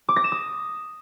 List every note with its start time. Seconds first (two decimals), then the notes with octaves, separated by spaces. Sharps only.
0.09 D6
0.16 A#6
0.24 E7
0.32 D#6